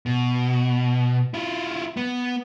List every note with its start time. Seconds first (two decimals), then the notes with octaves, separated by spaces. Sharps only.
0.06 B2
1.34 E4 F4
1.97 B3